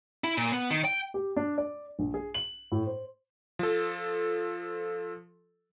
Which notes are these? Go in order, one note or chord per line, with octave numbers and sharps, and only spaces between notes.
E4
A#2
B3
D#3
G5
G4
D4
D5
A#1
G#4
F#7
A2
C5
F3 A4